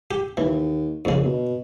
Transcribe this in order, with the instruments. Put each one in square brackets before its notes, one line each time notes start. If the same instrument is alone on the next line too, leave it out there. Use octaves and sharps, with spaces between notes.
[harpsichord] G4
[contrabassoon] D#2 [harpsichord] E3
[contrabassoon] A#1 [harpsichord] F2 C#3
[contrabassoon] B2